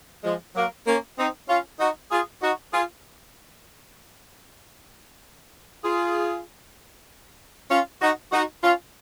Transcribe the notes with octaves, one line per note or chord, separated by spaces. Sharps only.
F3 G#3
F#3 A#3
A#3 C#4
C4 D#4
C#4 F4
D#4 F#4
F4 G#4
D#4 F#4
F4 G#4
F4 G#4
C#4 F4
D#4 F#4
D#4 F#4
C#4 F4